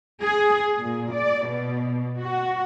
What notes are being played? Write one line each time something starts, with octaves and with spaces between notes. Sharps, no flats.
G#4
A#2
D5
B2
F#4